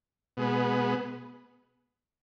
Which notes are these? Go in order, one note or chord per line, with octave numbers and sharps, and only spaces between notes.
B2 G#3 B3